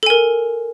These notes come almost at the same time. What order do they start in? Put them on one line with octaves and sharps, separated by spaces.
A4 G#5 A#4